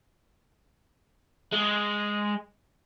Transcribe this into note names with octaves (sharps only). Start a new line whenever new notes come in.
G#3